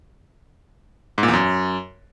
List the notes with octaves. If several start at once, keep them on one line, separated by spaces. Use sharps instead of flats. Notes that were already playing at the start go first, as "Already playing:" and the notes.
G#2
A#2
E2
F#2